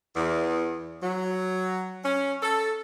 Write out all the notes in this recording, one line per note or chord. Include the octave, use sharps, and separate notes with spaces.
E2
F#3
C#4
A4